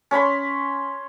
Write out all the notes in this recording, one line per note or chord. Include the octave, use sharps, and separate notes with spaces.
C#4 C#5 B5 C6